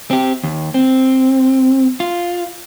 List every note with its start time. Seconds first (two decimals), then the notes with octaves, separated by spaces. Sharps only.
0.11 C4 G4
0.43 D#2
0.74 C4
2.00 F4